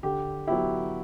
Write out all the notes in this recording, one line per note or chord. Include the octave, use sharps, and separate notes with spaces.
D3 G4
F#3 B3 E4 G4